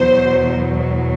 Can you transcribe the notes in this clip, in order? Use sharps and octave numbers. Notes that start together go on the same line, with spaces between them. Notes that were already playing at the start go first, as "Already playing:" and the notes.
Already playing: E2 B2 F#3 C5